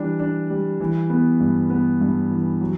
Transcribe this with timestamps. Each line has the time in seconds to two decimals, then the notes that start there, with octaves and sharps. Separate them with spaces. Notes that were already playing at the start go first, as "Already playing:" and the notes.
Already playing: E3 G3 D4
0.20 D4
0.50 G3
0.80 E3
1.10 B3
1.40 G2
1.70 B3
2.01 G2
2.31 E3
2.61 F#3